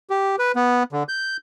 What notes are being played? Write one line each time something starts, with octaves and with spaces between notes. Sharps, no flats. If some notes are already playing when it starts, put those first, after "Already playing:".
G4
B4
B3
D3
G6